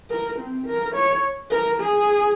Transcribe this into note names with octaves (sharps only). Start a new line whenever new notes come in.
A#4
C4
A#4
C#5
A#4
G#4